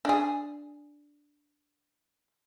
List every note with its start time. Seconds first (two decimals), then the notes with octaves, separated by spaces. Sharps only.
0.05 D4 G#4